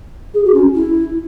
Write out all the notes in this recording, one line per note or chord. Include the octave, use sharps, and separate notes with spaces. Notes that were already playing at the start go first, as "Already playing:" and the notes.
G#4
F#4
C#4
E4